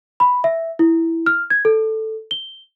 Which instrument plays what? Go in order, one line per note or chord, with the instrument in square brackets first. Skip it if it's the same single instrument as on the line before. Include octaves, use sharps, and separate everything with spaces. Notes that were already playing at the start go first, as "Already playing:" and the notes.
[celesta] B5
E5
E4
F6
G#6
A4
G7